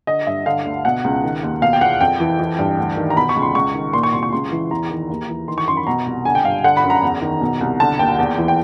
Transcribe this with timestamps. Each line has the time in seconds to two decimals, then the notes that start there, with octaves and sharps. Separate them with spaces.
0.07 D3 D#5
0.27 G2 E5
0.46 D3 F5
0.65 D2
0.85 B2 F#5
1.04 C#2
1.23 D#3
1.43 D#2
1.62 B2 F5
1.73 G5
1.81 E2 F#5
2.01 F2 G5
2.20 E3
2.40 E3
2.59 G2
2.78 D2
2.97 D#3
3.10 A#5
3.16 B2 B5
3.29 C#6
3.36 C#2
3.42 C6
3.55 C#2 C#6
3.74 D#3
3.93 A#2 C6
4.03 C#6
4.13 C2 C6
4.23 C#6
4.33 C#2 C6
4.52 E3
4.71 E2 A#5
4.90 D#3
5.10 D#2
5.29 E3
5.48 D#3 C6
5.58 C#6
5.68 F#2 C6
5.77 B5
5.87 B2 A#5
6.06 C2
6.25 D3 G#5
6.35 G5
6.45 G2 F5
6.64 D3 F#5
6.77 B5
6.83 F#2
6.90 A#5
7.03 E2
7.22 D#3
7.41 B2
7.61 C2
7.80 D3 A5
7.99 D#2 G5
8.19 E2
8.38 E3
8.48 G5